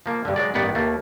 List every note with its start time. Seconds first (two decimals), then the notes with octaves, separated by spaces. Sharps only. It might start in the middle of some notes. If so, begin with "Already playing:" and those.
0.06 F3 A#3
0.25 G2 D3
0.36 F#3 G#3 D5
0.54 A1 G2 D#3 B3 D5 F#5
0.75 D#2 A3 A#3